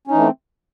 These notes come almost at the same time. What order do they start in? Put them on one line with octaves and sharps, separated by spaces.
C#4 D#4 E3 A3 C4